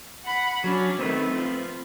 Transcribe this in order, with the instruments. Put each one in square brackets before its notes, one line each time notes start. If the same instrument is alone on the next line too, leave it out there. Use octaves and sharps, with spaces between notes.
[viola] F#5 B5
[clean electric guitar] F#3 [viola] C#4 D4
[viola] D#3 A3 [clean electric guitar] C4 B4
[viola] F3